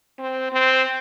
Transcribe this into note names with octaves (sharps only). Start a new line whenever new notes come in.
C4
C4